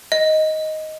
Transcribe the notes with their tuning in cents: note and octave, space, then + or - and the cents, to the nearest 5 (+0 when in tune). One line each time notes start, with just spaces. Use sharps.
D#5 +5